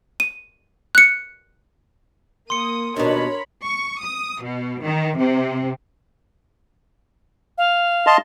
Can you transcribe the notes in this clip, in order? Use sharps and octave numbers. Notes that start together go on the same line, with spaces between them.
D#7
F#6 C#7
A#3 C6 D#6 C#7
D#2 B2 D4 A#4 C#5 B5
C#6
D#6
B2
D#3
C3
F5
D#5 A5 C6